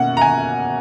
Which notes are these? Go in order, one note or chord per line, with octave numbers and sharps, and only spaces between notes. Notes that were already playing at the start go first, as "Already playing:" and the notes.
Already playing: B2 A#3 C#4 F#5
A#5
G#5